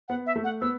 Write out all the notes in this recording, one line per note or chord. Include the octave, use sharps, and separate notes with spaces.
B3 F#5
E5
A3
F#5
B3 E6